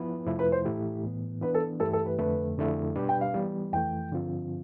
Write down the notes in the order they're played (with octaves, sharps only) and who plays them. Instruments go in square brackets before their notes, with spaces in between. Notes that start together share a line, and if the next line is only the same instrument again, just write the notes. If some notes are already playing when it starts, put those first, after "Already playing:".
Already playing: [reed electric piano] F3 B3 E4 B4
F2 C3 F3 A3 E4
[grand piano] B4
C5
[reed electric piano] A2 E3 A3 E4 G4
A2 E3 B3
[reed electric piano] E3 B3 D4 [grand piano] B4
[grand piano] A4
[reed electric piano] G2 E3 A3 E4 G4 [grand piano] A4
[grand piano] A4
B4
[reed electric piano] F2 D3 A3 [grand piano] B4
[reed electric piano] F2 D3 A3 E4
B2 G3 D4 G4 B4
[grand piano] G5
F5
[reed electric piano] E3 G3 B3
[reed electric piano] F2 E3 A3 [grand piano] G5
[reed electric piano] G2 D3 F3 C4 F4